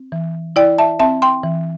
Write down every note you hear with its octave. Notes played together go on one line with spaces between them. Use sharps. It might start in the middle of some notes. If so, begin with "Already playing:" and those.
Already playing: C4
E3
E4 D5 G5
E5 A5
C4 E5 A5
G5 C6
E3